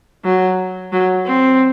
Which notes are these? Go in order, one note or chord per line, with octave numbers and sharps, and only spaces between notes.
F#3
F#3
C4